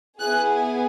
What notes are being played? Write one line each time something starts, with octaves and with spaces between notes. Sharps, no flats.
B3 E4 G#4 F#6